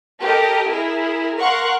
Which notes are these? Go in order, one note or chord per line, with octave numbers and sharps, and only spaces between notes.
G4 A4 A#4 D#5
E4 G#4 A#4
A#4 F5 F#5 C6 C#6 F#6